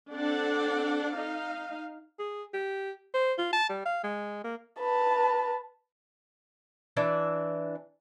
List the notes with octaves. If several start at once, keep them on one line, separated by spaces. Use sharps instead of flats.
C4 D4 A4 D5 F#5
D#4 F5
G#4
G4
C5
F4
A5
G3
F5
G#3
A#3
B4 A5
E3 D4 E5